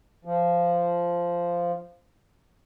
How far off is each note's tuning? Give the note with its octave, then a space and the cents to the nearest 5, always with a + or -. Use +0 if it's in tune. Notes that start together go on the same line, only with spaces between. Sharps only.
F3 -10